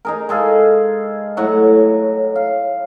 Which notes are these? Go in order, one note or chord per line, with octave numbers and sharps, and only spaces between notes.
D#4 G#4 A#4
G#3 G#4 A4 F5
A2 F#3 F#5 C#6
F5